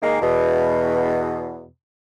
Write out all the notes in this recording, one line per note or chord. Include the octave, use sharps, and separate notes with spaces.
D#3 G#3 A#3
E2 B2